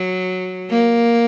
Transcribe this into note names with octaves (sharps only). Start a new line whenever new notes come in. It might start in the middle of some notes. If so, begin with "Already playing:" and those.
Already playing: F#3
A#3